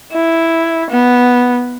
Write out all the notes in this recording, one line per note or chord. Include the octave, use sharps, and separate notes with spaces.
E4
B3